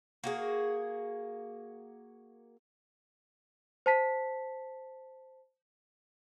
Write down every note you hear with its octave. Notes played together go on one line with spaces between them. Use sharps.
A#3 F#4 G#4
C5 A5 B6